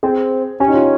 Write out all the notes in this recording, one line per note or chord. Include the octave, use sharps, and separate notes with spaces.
C4 G#4
C#4 G4
D#4
F4